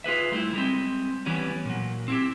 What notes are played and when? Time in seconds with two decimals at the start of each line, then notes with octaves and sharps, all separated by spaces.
0.04 F4 G#4 B4 E5
0.32 G3 A3 D#4 E4
0.53 G3 G#3 C4
1.26 E3 G3 B3 C#4
1.65 A#2 F#3
2.08 C4 E4 G4